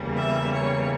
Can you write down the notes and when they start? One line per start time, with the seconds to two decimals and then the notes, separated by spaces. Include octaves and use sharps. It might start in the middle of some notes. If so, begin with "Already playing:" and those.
Already playing: E2 C#3 E3 G3 A#3
0.16 E5
0.53 C#5